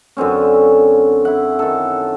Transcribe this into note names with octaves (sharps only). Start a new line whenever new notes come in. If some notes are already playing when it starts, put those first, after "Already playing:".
F#2 D3 C4 C#4
E4 F#5
D#3 A4